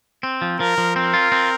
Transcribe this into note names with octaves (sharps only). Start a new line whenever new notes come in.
C4
F3
F3 A#4
F3
C4 A#4
F4
C4